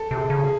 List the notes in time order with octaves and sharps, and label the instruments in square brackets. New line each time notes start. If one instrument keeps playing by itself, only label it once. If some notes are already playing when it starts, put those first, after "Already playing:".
Already playing: [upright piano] A4
[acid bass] C3
[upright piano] G#4
[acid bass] C#3
[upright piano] G#4